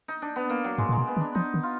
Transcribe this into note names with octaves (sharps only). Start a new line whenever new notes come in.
D#4
D4
B3
A#3
F#3
G#2 G#3
A#2 G#3
B2
B3
D#3
D4
F3 D#4
D#3
F4